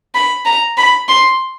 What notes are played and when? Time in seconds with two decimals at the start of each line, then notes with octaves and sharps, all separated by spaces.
0.15 B5
0.46 A#5
0.77 B5
1.09 C6